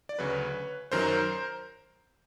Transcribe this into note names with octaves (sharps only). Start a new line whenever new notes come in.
D5
D2 C#3 F#3 B4 C#5
F#2 D#3 F#3 A#4 C5